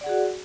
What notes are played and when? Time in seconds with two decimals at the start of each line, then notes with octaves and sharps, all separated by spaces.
0.01 D5
0.04 F#5
0.06 G#4
0.09 F#4